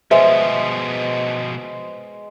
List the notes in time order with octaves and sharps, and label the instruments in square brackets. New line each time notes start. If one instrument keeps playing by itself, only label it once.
[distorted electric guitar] B2 F3 [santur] G#3 [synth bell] B4 C5 G#5 [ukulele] E5